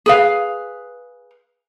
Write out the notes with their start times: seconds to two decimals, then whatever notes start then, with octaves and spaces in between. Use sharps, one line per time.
0.06 G#4 B4 F5